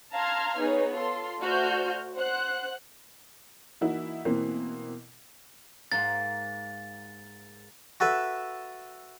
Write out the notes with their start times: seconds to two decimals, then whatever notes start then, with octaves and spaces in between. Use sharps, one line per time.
0.14 F5 A5 A#5 C6 F6 G#6
0.59 B3 D#4 G#4 C#5
0.95 F4 A4 C6
1.42 A3 F#4 C5 D5 F6 G6
2.16 C5 F#5 F#6
3.81 E3 A#3 D#4 E4 F#4
4.25 B2 E3 A#3 C4
5.92 G#2 A#3 C6 A6
8.00 F#4 A4 B4 E5